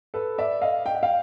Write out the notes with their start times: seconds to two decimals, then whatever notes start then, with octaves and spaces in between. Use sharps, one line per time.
0.14 A4 B4
0.38 D5 E5
0.61 D#5 F5
0.86 G5
0.95 F#5
1.03 F5 G5